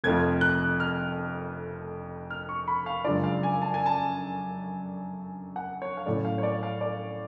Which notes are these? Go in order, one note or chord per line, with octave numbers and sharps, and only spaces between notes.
F1 F2 F3 A3 F4 G#6
F#6
F6
F6
C#6
B5
F5
F#2 C#3 G#3 D4 F4 D5
F5
G#5
A5
G#5
A5
F#5
C#5
F5
A2 F#3 A3 C#4 D5
F5
C#5
D5
F5
D5